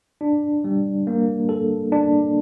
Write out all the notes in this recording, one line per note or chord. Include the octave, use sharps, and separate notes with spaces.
D4
G3
A#3
A4
D4